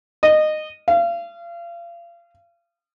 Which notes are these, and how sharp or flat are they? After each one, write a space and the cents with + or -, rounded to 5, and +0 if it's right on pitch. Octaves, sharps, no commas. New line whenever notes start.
D#5 -20
F5 -35